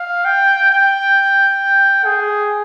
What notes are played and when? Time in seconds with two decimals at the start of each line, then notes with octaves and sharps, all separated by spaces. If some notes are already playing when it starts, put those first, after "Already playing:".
Already playing: F5
0.25 G5
0.71 G5
2.05 G#4